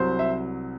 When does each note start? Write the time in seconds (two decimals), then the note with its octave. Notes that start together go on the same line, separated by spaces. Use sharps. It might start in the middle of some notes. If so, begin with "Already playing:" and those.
Already playing: C2 C3 F#3 C5
0.19 E5